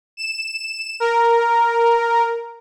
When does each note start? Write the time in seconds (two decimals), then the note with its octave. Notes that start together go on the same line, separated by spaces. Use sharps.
0.17 E7
1.00 A#4